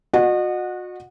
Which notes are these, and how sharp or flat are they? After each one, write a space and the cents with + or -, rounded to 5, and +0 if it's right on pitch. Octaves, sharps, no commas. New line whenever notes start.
F#4 -35 D#5 -35 F#5 -15